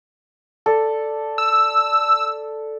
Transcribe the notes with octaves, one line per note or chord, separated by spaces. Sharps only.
A4 D5
E6